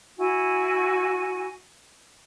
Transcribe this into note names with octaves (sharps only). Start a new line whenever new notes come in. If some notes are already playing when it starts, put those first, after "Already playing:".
E4 F#4 G#5